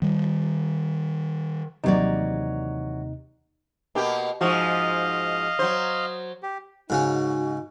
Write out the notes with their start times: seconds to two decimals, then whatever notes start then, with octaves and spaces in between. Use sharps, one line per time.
0.02 D#3 G3
1.84 D#2 C3 E3 F#3 D#4 D5
3.95 B2 A#3 G4
4.41 G#2 F3 F#4 D#5 F5
5.59 F#3 C5
6.43 G4
6.90 G#2 C#3 C#4 D#4 F#4